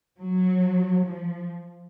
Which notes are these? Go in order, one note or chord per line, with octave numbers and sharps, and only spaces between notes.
F#3
F3